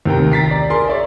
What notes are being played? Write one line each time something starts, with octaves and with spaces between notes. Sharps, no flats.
D#2 C3 G5 A#5
A#5 A6 B6 C7
D5
G#4 A#4 C6
C#5 D5 E5